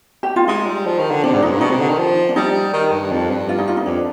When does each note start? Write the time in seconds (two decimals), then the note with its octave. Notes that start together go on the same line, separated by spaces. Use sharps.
0.23 G4
0.36 F4
0.48 G#3 D#4
0.66 G3
0.86 F3
0.99 D#3
1.11 D3
1.23 C3 D4
1.33 G#2
1.42 F2 D#4
1.51 G2
1.60 B2 D#4
1.70 C3
1.80 D3
1.89 D#3
1.98 F3
2.29 D4
2.36 G3 D#4
2.73 D#3
2.92 G2
3.11 F2
3.30 G2
3.49 F4
3.58 D#4
3.68 F4
3.77 D#4
3.86 F2 D4